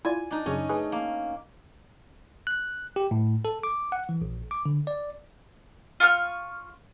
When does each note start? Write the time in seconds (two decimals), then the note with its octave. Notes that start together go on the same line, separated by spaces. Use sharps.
0.05 E4 F4 D5 G#5
0.31 D4 D#4
0.46 F#2 C#3 C#4 D#5
0.69 A3 C#4 G#4 B4
0.92 A#3
2.47 F#6
2.96 G4
3.11 A2
3.45 A4
3.63 D6
3.92 F#5
4.09 E3
4.22 A#1
4.51 D6
4.66 D3
4.87 D5
6.00 F4 C#6 D#6 F6